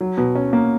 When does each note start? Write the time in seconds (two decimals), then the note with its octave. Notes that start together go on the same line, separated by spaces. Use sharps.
0.01 F#3
0.17 B2
0.35 C#4
0.53 A#3